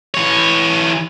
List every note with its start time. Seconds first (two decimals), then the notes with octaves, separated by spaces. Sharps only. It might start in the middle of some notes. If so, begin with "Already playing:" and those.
0.14 E3 C#5